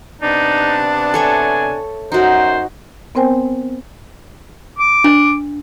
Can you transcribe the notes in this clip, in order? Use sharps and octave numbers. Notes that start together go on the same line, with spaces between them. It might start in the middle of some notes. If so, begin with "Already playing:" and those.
C3 B3 D4 D#4
A4 C#5 E5 G#5
F#2 D#4 F#4 C5
B3 C4 A#4 C5 G5 G#5
D6
D4